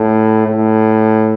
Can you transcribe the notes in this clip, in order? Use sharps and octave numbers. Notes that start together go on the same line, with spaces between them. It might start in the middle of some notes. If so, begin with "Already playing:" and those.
Already playing: A2
A2